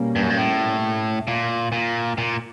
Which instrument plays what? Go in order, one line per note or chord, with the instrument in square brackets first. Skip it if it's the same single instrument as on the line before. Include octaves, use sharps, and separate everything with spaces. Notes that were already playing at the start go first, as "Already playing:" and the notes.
Already playing: [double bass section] B2 G3 A#3 C#4
[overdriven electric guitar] G2
F#2
G2
A2
A#2
A#2
A#2